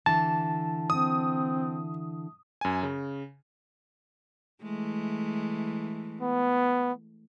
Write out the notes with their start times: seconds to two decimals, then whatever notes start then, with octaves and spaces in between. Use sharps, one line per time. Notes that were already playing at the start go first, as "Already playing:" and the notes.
0.06 D3 E3 A5
0.90 C4 D#6
2.61 F#2 G#5
2.83 C#3
4.63 E3 G#3 A3
6.21 B3